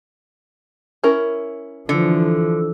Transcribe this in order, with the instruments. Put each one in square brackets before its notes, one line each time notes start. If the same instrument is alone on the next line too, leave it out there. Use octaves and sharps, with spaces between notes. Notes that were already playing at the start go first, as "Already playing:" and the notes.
[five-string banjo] C#4 E4 A#4
[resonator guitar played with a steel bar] D3 [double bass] E3 F3